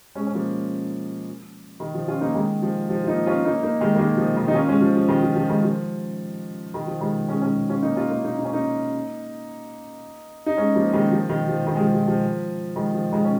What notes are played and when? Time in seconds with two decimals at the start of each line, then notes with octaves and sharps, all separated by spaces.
0.15 G#3 C#4
0.27 C#4
0.34 F3 A#3
1.80 D#3
1.94 F3
2.08 C#4 F4
2.21 A#3 D#4
2.35 D#3 G#3
2.62 F3
2.89 F3
3.04 F4
3.08 A#3 D#4
3.26 C#4 F4
3.45 A#3 D#4
3.63 A#3 D#4
3.81 D#3 G#3
3.95 A#3
3.99 D#3 G#3
4.17 F3
4.37 D#3
4.48 D#4
4.54 C#4 F4
4.69 G#3 C#4
4.81 F3
4.96 F3
5.09 D#3 G#3
5.23 F3
5.36 F3
5.50 D#3 G#3
5.64 F3
6.74 D#3
6.87 F3
7.00 D#3 G#3
7.28 G#3 C#4
7.42 G#3 C#4
7.70 C#4 F4
7.83 A#3 D#4
7.96 C#4 F4
8.10 A#3 D#4
8.24 A#3 D#4
8.38 D#4
8.45 C#4
8.53 A#3 D#4
10.46 D#4
10.57 G#3 C#4
10.75 F3 A#3
10.93 D#3 G#3
11.12 F3
11.29 D#3
11.48 F3
11.67 D#3
11.76 G#3
11.81 F3
11.94 F3
12.08 F3
12.76 D#3 G#3
12.94 F3
13.12 D#3 G#3
13.24 C#4